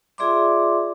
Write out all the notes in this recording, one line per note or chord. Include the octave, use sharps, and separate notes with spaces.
F4 G#4 D5 E5 C6 D6